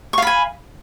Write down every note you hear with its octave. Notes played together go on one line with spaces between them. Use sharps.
F5 G#5 B5 C#6